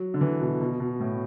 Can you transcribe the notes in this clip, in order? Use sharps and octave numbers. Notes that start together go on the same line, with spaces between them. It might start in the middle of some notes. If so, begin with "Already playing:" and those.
Already playing: F#3
D3
E3
B2
B2
B2
A2